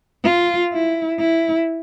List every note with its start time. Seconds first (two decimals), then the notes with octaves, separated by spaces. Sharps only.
0.24 F4
0.73 E4
1.20 E4